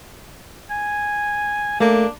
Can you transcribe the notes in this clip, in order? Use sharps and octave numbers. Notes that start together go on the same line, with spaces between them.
G#5
A3 A#3 D4